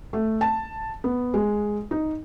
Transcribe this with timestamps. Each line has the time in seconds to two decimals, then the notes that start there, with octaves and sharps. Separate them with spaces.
0.13 A3
0.41 A5
1.04 B3
1.34 G#3
1.91 D#4